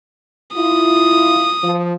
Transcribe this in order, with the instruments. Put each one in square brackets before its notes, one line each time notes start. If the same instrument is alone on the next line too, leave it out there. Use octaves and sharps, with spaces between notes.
[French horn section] E4 F4 [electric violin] D#6
[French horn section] F3